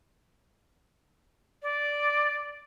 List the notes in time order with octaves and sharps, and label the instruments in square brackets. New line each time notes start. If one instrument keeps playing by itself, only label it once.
[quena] D5